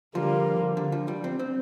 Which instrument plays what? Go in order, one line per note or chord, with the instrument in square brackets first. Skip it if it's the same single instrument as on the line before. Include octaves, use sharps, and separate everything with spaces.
[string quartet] D3 G3 A#3 F4 [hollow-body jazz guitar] F3
[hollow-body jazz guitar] D3
F3
G3
C4
C4